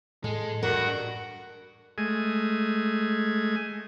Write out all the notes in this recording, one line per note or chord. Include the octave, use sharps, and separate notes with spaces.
A2 G#3 A4
G2 F#4 A#4
G#3 A3 G#5